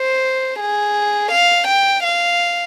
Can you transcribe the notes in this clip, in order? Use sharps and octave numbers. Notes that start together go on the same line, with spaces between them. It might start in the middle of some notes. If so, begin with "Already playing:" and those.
Already playing: C5
G#4
F5
G5
F5